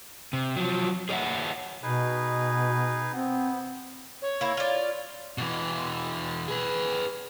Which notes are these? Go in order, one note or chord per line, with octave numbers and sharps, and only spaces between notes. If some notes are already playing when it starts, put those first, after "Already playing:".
C3
F3 F#3
G#4 C#5 D5 E5 F#5
B2 D#4 G#4 B4
B3 C4
C#5
A#3 E4
F4 D5
B2 E3
G#4 B4